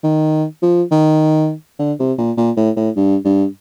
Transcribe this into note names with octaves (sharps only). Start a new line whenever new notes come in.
D#3
F3
D#3
D3
C3
A#2
A#2
A2
A2
G2
G2